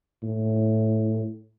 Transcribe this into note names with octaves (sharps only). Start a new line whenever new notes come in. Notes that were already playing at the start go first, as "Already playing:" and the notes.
A2